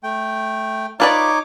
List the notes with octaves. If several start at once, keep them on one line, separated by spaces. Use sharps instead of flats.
A3 G5
D#4 F4 B4 C#5 D5 D6